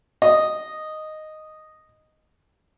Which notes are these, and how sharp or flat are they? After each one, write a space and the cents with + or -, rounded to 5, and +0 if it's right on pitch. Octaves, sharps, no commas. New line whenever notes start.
D#5 -5